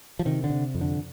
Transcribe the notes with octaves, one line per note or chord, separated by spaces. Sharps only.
F3
C3 D#3
D3
C3
F2
D3